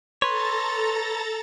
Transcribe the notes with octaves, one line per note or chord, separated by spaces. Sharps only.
A4 B4 C#5 A#5 C6 A6